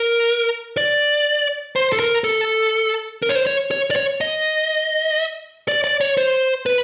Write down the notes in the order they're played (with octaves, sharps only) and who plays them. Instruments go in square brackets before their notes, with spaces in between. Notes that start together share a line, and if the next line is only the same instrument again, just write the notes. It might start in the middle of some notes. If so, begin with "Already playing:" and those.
Already playing: [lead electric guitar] A#4
D5
C5
A4
A#4
A4
A#4
C#5
C5
C#5
C#5
D5
C#5
D#5
D5
D5
C#5
C5
B4